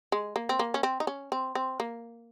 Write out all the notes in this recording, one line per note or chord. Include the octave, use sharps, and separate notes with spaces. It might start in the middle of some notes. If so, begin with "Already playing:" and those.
G#3
A#3
C4
A#3
C#4
C4
D#4
C#4
C4
C4
A#3